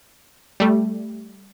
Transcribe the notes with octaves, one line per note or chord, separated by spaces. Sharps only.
G3 A3